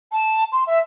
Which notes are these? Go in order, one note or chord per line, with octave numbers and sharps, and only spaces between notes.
A5
C6
E5